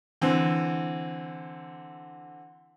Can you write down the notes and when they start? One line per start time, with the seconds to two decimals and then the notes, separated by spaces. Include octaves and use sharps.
0.22 D3 E3 C4